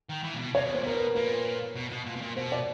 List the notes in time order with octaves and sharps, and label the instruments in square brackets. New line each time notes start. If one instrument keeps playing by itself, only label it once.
[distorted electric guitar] D#3
E3
A#2
B2
[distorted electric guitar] C3 [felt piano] C#5
[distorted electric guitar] B2
[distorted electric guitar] A#2 [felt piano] C5
[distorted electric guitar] B2 [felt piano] A#4
[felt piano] B4
[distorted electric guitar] A#2 [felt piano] B4
[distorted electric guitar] B2
B2
A#2
B2
A#2
[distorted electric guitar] B2 [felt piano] C5
[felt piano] D5